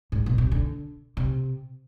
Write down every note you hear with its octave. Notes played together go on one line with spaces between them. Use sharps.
G#2
B2
C3
D3
C3